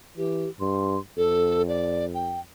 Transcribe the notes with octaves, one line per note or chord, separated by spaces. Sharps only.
E3 G4
G2 C6
F2 A4
D5
G5